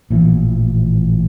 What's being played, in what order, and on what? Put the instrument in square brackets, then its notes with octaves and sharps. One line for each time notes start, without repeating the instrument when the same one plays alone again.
[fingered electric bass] A1 A#2 E3 F3